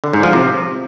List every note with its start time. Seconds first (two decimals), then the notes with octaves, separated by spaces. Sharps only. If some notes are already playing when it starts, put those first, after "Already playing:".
0.04 D3
0.13 G#2
0.23 F3
0.33 C3